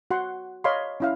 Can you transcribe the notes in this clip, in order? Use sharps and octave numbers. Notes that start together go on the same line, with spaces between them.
F#4 F#5 C6
C#5 D#5 F5 B5 C6
C#4 E4 F5